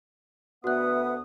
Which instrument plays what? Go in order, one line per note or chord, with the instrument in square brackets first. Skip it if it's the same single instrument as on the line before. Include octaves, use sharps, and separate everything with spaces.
[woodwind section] D2 B3 D#6 [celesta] F#4 F#6 [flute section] B4 E5 F#5